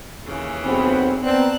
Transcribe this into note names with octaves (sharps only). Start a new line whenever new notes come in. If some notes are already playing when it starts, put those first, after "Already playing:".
D#2 C#3 E3
B1 C4 G#4 F#5 B5
B3 C4 D5 A5 A#5 F#6